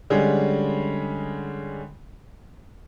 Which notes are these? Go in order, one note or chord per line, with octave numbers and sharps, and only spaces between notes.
D3 G3 G#3 C#4